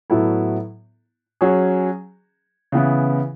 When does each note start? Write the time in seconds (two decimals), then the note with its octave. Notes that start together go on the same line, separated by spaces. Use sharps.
0.10 A2 F#3 B3 E4 A4
1.41 F#3 C#4 G#4
2.72 C#3 E3 B3 E4